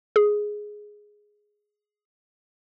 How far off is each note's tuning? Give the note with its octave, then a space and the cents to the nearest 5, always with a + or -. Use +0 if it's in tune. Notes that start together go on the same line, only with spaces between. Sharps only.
G#4 +5